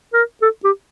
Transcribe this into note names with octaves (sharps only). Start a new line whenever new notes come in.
A#4
A4
G4